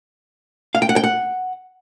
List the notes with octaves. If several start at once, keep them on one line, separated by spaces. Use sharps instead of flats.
F5
G5
F#5
G5
F#5